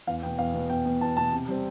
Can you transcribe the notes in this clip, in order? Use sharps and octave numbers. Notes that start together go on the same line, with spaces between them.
E2 F5
B2 B3 G5
E2 F5
B2 B3
E2 G5
B2 B3
E2 A5
B2 B3 A5
C3
G3 C4